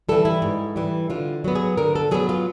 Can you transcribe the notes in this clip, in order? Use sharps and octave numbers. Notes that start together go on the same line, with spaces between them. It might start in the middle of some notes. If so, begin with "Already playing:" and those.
E3 G3 A4
E4
G#2
E3 G3
D3 F4
F#3 B3
G#4
D3 A#4
A4
F#3 B3 G#4
F4